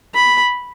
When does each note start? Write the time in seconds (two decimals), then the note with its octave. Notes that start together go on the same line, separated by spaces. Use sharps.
0.14 B5